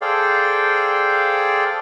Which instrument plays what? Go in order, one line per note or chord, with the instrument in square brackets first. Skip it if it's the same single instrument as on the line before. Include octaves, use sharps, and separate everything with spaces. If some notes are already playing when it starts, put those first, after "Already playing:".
[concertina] G#4 A4 C5 D5 F5 G5